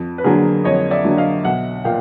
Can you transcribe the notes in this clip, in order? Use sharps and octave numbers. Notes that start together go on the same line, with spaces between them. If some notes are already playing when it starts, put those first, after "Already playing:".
Already playing: F2
B4
D3 F#3 A#3 G#4 A#4
F2 C#5 D#5
D5 E5
D3 F#3 A#3
D#5 F5
B1 E5 F#5
A#2 F5 G5